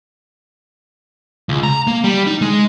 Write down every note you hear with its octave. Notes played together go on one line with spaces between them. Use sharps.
C#2
A#5
A#3
G3
D#4
G#3